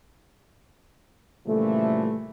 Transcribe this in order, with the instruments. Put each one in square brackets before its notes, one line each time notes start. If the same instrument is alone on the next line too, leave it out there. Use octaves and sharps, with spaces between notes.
[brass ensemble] A#2 C#3 E3 F3 G3 A3